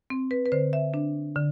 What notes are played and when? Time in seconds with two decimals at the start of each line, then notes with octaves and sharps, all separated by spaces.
0.10 C4
0.31 B4
0.46 B4
0.52 D3 C5
0.73 E5
0.94 D4
1.35 D3